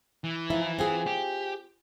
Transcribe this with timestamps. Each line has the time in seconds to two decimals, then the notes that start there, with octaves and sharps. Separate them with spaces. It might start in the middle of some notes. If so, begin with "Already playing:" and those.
0.24 E3
0.50 F3 D#4 E4
0.79 C4 F4 G#4
1.06 G4